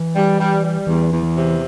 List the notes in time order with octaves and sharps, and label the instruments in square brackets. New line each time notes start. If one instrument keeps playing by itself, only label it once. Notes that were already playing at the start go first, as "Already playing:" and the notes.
Already playing: [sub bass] E3
[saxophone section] G3
G3
G3
[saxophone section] E2 [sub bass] E3
[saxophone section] E2
[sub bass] E3
[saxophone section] C3